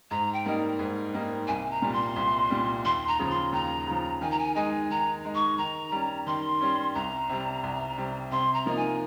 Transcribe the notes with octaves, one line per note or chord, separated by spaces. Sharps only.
G#2 A#5
G5
G3 A#3 D#4
G#2
G3 A#3 D#4
C2 G#5
A#5
A#2 G3
C6
C2
A#2 G3
D#2 C6
A#5
C#3 F3
C6
D#2 A#5
C#3 F3
D#3 G#5
A#5
G#5
G#3 D#4 G#5
D#3 A#5
G#3 D#4
C#6
D#3 A#5
G3 C#4
D#3 C6
G3 C#4
C2 A#5
C3 G3
C2
C3 G3
C3 C6
A#5
F3 A#3 D#4
G#5